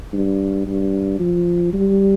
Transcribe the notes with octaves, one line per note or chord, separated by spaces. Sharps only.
G2
G2
F3
G3